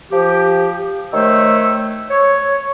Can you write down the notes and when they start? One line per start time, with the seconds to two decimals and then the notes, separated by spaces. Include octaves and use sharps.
0.12 F3 G4
1.14 D#3 A3 C5 C#5 E6
2.10 C#5